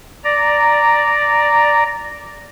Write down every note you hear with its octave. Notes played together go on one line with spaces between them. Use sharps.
D5 A#5